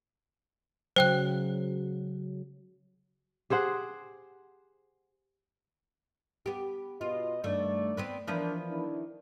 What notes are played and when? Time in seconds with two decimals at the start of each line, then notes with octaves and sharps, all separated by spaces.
0.96 C#3 F#3 C5 G5 F#6
3.50 G4 G#4 C5 F#5
6.46 B3 G4
7.01 B2 B3 F4 D#5
7.44 G2 D#3 A3 D5
7.97 B3 C4 B4
8.27 E3 F3 B3 D4 A#4
8.69 D#3 D4 E4